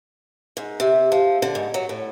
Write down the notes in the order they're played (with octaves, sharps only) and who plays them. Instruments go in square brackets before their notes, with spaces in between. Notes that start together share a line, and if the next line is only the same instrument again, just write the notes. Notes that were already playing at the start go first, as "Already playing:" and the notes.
[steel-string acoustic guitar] G#2
C3
F3
D3
G#2
F#3
A2